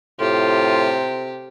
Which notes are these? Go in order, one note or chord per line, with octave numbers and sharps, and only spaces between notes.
A2 C3 F4 G4